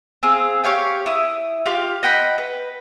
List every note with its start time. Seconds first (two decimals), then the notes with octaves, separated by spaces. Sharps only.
0.23 C4 G#4 F5
0.64 G4 C#5 F5 G5
1.06 E4 D#6
1.66 F4 G4 F5
2.03 D#5 F#5 G5 B5
2.38 B4